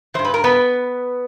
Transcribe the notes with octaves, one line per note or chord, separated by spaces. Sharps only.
G2 E3 C5
B4
A#4
B3 B4